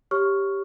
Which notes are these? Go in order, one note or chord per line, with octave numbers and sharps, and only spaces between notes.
G4 C#5 C#6 F6